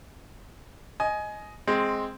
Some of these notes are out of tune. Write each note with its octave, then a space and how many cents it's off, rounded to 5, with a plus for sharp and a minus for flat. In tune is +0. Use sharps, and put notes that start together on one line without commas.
D#5 +0 G#5 +20
G#3 +0 C4 +5